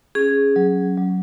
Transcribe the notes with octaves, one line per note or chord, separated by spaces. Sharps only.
C#4 G#4
F#3
F#3